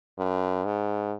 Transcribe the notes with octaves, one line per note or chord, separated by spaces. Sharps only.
F#2
G#2